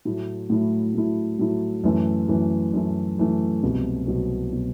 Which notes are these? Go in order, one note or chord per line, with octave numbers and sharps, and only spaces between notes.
A2 F#3 A3 E4
A2 F#3 A3 E4
A2 F#3 A3 E4
A2 F#3 A3 E4
F#2 E3 A3
F#2 E3 A3
F#2 E3 A3
F#2 E3 A3
C2 B2 F#3
C2 B2 F#3
B2 F#3